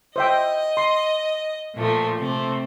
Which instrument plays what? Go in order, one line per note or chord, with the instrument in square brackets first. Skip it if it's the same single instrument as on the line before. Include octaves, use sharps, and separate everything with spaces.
[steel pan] C5 E5 G5 [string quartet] D#5
[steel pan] C6
[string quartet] A#2 F3 A3
C3 A3 C4